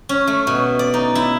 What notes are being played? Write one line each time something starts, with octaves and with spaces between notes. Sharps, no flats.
C#4
A3
B2
D5
D#4
E4